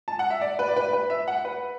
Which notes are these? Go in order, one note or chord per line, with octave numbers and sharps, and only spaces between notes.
A5
F#5
E5
D5
B4
D5
B4
B4
E5
F#5
B4